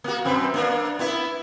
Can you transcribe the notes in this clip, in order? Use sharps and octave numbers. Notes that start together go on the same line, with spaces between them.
A#3 F#4
F#2 C4 B4
A#3 D4
B3 E4